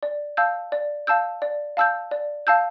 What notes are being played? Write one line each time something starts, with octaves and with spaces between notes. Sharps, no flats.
D5
F5 A5 E6 G6
D5
F5 A5 E6 G6
D5
F5 A5 E6 G6
D5
F5 A5 E6 G6